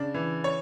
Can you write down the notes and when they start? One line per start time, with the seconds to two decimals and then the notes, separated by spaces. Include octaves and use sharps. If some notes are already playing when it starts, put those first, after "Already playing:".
Already playing: C#3 D4
0.14 E3
0.44 C#5